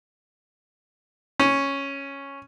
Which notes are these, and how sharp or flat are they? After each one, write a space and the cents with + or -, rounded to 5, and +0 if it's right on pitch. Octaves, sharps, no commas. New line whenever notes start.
C#4 -5